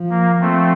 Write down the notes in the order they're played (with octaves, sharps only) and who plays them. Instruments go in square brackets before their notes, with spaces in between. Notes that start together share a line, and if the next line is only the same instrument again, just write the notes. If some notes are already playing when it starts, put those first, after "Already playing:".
Already playing: [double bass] F3
[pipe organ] A#3
[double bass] F3 [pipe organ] A3 C4